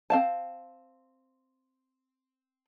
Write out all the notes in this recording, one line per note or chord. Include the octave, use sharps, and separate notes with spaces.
C4 F5 A5